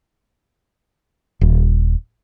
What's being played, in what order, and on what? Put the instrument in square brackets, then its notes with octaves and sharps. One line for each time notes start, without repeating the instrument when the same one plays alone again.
[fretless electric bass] D#1